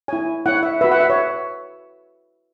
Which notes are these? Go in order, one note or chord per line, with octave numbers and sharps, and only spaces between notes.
E4 C#5 G#5
E4 C#5 F#5
E5
F#4 B4 E5
F#5
E5
C#5